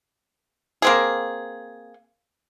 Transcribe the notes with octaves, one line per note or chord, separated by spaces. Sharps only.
A#3 C4 G#4